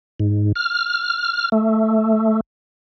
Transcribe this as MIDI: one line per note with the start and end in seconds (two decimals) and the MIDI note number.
0.20 0.52 44
0.55 1.49 89
1.52 2.40 57